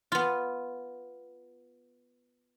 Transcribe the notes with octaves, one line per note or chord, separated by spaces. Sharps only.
B3 F4